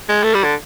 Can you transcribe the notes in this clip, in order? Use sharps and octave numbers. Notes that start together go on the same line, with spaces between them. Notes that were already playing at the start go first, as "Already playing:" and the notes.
G#3
A3
G3
D3